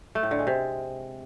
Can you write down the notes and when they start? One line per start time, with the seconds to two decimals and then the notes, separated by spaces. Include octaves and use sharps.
0.15 A3
0.23 A2
0.31 D3
0.39 G#3
0.47 C3